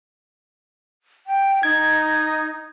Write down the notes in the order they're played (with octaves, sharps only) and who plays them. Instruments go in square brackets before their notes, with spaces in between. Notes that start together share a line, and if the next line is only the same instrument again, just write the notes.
[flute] G5
[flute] D#4 [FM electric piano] G#6